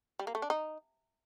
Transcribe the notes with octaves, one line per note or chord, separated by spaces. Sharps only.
G3
A#3
A3
D4
D#4